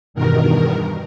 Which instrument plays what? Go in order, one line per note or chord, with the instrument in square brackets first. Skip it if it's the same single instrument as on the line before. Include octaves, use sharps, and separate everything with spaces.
[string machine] E2 G2 B2 D#3 A#4